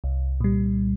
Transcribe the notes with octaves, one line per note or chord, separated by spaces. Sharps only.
C2
A#2 G3